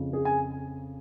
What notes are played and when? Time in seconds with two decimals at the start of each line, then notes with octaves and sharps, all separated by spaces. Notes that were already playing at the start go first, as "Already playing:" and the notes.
Already playing: F2 C#3
0.13 G#4
0.25 G#5